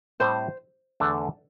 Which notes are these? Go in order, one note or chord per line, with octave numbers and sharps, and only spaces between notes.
A2 G3 C4 G4 C5
E2 D3 A3 D4 A4